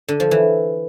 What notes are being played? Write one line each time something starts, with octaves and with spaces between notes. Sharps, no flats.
D3
F3
E3